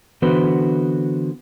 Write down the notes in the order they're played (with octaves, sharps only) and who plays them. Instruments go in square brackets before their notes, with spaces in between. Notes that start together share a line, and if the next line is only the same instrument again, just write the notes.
[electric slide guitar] D3 E3 B3 F#4 B4 C5